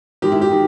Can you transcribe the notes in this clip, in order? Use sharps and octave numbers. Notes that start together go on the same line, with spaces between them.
G#2 D#3 G4
E4
G4
D#3